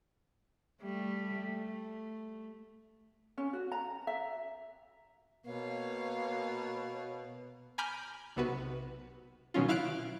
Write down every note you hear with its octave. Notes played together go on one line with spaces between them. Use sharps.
G3 A3
A3
C#4
F#4
A#5
E5
B2 A#3 C#5 F5
G#5 A#5 B5 D6 F6 G6
B1 C3 B3 F#4 B4
B2 D#3 F#3 C#4 F4
E4 F5 F6 F#6 D7